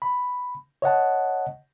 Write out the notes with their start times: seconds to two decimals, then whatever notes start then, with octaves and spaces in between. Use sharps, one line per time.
0.02 B5
0.82 C#5 D#5 F#5 A5